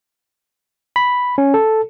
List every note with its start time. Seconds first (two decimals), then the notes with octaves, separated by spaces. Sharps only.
0.96 B5
1.38 C#4
1.54 A4